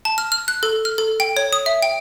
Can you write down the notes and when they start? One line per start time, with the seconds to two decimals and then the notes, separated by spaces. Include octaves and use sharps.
0.05 A5
0.18 F6
0.32 F6
0.48 F#6
0.63 A4
0.85 F6
0.98 A4
1.20 G5
1.37 C#5
1.53 D#6
1.66 E5
1.82 G5